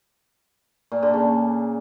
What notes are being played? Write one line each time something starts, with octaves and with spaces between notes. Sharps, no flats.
A#2
D3
C#3